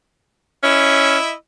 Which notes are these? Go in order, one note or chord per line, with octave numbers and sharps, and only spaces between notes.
C#4 E4 D#5 E5